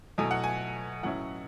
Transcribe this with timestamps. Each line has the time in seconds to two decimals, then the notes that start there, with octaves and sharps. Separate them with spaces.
0.18 B2 F#3 A3 E4 G#5
0.31 F#5
0.44 G#5
1.03 A2 F#3 C#4 E4 F#5